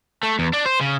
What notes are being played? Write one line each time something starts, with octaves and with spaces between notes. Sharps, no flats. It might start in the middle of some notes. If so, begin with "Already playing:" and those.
A3
E2
D4
C5
C#3